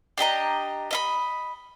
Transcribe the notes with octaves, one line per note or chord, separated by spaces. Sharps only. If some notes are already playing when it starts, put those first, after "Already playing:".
D4 G4 D#5 A#5
D#5 E5 B5